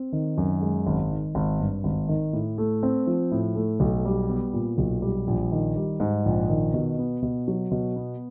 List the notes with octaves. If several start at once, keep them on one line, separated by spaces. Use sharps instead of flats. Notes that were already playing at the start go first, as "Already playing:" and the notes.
Already playing: C4
D#3
F#2
G#3
G#1
D#3
G#1
G2
G#1
D#3
A2
A3
C4
F3
A2
A3
B1
G3
B3
A#2
B1
G3
A#1
D#3
G3
G#2
A#1
D#3
B2
B3
B2
F#3
B2
B3